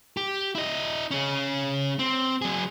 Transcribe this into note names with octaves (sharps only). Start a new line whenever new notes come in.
G4
E4 D#5
C#4 G#4
C4
F#3 G#4